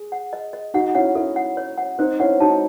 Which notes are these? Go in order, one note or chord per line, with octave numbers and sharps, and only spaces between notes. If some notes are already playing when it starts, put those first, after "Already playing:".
Already playing: G#4
F#5
D#5
D#5
D#4 F#4 F#5
C#4 E4 F#5
C#4 E4 A4
F#5
C#5
F#5
C4 D#4 C5
C#4 E4 F#5
D#4 F#4 A5